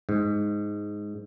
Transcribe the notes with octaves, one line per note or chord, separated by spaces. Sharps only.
G#2